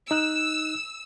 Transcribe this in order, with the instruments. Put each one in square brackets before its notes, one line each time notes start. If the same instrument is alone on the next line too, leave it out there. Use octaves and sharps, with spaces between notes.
[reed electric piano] D#4 F#6 [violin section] E6